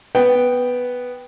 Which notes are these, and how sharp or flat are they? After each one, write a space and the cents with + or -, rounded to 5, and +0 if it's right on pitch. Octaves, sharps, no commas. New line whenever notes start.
B3 +0 G5 +0